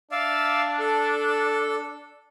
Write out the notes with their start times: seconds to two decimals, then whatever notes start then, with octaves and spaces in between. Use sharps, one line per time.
0.12 D4 D5 E5 F5
0.79 A4